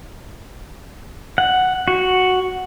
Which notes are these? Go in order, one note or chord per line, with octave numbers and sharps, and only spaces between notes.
F#5
F#4